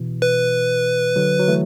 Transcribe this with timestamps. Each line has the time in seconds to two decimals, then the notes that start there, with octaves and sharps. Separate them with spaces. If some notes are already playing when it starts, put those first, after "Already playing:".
Already playing: B2 E3
0.22 B4
1.16 D3 F#3
1.39 F#3
1.48 E3 A3